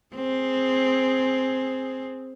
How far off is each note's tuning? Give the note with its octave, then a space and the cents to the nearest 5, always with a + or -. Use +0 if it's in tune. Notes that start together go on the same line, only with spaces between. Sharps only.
C4 +0 G#4 +0